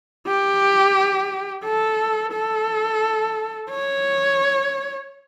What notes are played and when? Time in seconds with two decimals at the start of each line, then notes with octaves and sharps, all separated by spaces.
0.27 G4
1.65 A4
2.33 A4
3.71 C#5